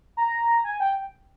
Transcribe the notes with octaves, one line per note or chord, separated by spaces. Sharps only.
A#5
G#5
G5